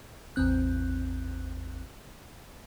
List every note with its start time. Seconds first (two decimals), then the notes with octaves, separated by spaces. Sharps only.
0.36 A1 E2 C4 F#6